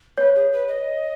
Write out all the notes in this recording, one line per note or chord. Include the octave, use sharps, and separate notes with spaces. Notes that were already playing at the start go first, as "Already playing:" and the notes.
B4 C#5
G#4
B4
D#5